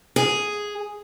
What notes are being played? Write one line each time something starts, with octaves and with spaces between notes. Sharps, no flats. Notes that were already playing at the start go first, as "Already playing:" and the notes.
G#4